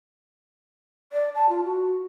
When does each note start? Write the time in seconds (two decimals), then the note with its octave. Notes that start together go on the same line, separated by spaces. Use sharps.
1.13 D5
1.35 A5
1.49 F4
1.64 F#4